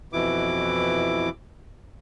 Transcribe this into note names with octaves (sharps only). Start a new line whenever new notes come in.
F2 B2 E3 E4 D6